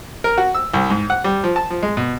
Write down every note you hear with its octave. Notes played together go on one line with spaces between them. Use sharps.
A#4
F#4
E6
C2
G#2
F#5
G3
F3
A5
F3
G#3
B2